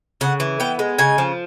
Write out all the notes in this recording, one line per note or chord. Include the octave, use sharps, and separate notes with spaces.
C#3 F#5
E3
B3 G5
G#3
C#3 G#5
F3